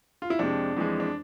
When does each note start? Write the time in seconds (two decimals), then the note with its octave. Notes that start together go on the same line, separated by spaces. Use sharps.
0.22 F4
0.30 E4
0.39 F2 C3 G#3 D4
0.76 F2 E3 G#3
1.00 D4